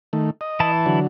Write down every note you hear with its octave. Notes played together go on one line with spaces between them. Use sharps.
D#3 A3
D#5
E3 E4 A5
D3 F#3